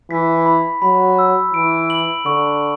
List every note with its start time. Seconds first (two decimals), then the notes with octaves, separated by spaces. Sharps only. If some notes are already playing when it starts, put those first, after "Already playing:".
0.11 E3 B6
0.46 B5
0.82 F#3 B5
1.19 E6
1.54 E3 D7
1.90 F#7
2.25 D3 C#6